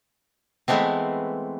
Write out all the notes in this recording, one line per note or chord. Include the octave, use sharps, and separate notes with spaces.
E3 G#3 A3 B3 C4